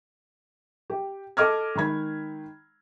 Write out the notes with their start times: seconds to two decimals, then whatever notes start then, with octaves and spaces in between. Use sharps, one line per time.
0.90 G4
1.37 A4 D#5 D6 F6 G#6
1.75 D#3 G#3 B5 G#6